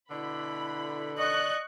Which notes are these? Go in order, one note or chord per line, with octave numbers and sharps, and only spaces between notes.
B2 D3 E4 B5
D5 D#5 C#6 F#6